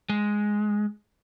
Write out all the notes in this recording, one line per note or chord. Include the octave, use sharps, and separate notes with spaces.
G#3